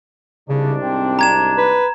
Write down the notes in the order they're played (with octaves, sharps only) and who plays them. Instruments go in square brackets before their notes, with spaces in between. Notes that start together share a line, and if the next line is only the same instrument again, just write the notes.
[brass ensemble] C2 G#2 D4 [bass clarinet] C#3
[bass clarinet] C4
[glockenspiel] A#5 G#6 E7
[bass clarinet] B4